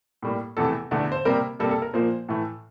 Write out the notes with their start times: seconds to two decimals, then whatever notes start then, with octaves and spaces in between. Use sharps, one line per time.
0.22 A2 G3 A#3
0.57 E2 C3 E3 A3 A4
0.91 E2 D3 A3
1.12 C5
1.25 C3 G3 A#3 A#4
1.59 C3 G3 A#3 A4
1.71 A4
1.82 A#4
1.94 A#2 F3 A#3 C5
2.29 A2 E3 A3